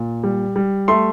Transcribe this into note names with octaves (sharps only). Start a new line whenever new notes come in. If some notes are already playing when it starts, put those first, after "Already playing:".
Already playing: A#2
G3
G3
A3 C6